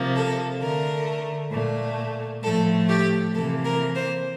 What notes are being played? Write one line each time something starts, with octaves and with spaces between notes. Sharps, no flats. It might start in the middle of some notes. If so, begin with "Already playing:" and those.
Already playing: C3 F3 A#3
A4
D3 A3 A#4
A#2 A3
A2 F3 A3 A4
G4
C3 E3 A#3 A4
A#4
C5